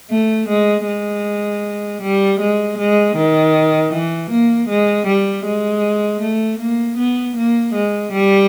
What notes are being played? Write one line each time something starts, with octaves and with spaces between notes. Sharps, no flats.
A3
G#3
G#3
G3
G#3
G#3
D#3
E3
A#3
G#3
G3
G#3
A3
A#3
B3
A#3
G#3
G3